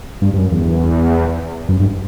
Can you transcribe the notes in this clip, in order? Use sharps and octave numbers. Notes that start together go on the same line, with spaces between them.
G2
G2
F#2
E2
F#2
G2